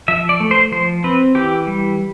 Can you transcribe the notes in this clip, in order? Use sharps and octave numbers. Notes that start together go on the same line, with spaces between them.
F3 E5
D5
A3
C5
F3 C5
C4 B4
E3 G4
G3